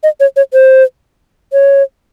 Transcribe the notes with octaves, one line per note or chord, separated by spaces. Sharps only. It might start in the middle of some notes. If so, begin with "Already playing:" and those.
D#5
C#5
C#5
C5
C#5